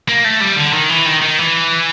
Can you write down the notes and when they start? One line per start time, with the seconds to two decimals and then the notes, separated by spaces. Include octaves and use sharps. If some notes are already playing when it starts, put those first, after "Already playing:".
0.08 A#3
0.24 A3
0.40 G3
0.56 D3
0.73 D#3
0.89 E3
1.06 D#3
1.21 D#3
1.38 E3